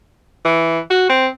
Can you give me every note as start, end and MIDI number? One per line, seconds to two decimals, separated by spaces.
0.45 0.79 52
0.90 1.07 66
1.09 1.27 60